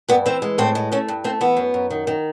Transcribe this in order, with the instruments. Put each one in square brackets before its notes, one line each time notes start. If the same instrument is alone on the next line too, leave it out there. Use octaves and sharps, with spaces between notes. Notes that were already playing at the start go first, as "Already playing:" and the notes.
[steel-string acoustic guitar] G2 B3
E3 C4
G#3
A2 C4
G#3
A3 C#4
G2
A3 C4
E3 B3
F#2
F#2
D#3
D#3